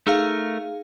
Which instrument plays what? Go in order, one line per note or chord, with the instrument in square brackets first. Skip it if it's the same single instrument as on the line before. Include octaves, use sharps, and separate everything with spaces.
[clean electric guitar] A3 A#4 [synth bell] D#4 G#4 F5